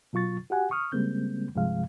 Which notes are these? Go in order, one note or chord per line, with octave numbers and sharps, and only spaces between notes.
B2 F#3 F4 C#6 A6
F#4 G4 F#5 G#5
C#6 D#6 F6
C#3 G3 G#3 A#3 C4 G6
C2 G2 C3 F3 G#3 F5